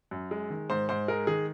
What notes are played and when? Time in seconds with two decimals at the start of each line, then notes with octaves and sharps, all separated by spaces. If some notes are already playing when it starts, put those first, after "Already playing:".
0.11 F#2
0.31 G#3
0.50 D#3
0.70 G#2 C5
0.89 G#2 C5
1.08 G#3 A#4
1.27 D#3 G#4